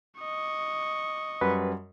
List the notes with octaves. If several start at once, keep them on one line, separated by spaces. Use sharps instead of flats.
D#5 C#6
F#2 G3 B4 F#5